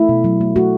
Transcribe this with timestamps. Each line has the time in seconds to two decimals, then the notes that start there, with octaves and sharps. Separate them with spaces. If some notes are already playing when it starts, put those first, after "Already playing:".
Already playing: A3 E4
0.09 B2
0.24 F#3
0.41 A3
0.56 A3 F#4